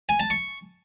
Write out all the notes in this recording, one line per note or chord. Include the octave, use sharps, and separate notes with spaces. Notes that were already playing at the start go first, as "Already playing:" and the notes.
G#5
A5
C#6